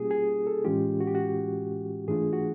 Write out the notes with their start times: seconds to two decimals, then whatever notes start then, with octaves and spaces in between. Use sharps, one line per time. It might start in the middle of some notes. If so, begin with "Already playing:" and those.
Already playing: B2 G3 A#3 C#4 F4 G4 G#4
0.11 G#4
0.47 A4
0.65 A2 E3 G#3 C#4 F4 G4
1.00 F#4
1.07 G4
1.15 F#4
2.08 G#2 E3 A3 D4 F4 G#4
2.33 F#4